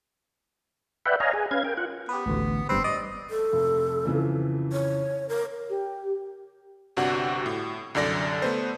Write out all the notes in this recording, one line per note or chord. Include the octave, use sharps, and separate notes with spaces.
B4 D5 E5 F#5 G5
C#5 D#5 F5 G#5 A#5
G#4 G#5
C#4 B4 F5 G#6
A#4 G5
F4 F#5
B3 G4 B4
A1 D2
G1 G2 C4 B4
D5 D#5
A4
F1
F2 C#3 E3
C#5
A#4
G4
G1 C3 D4 F#4 F#5
A2
C2 F#2 D3 D5 A#6
A3 B3 C5